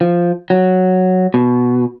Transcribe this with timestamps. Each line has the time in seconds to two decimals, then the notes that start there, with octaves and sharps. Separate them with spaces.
0.01 F3
0.50 F#3
1.34 B2